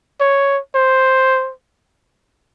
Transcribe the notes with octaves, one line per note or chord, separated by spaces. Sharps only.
C#5
C5